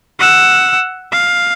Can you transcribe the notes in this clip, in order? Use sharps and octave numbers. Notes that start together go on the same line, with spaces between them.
F#5 E6
F5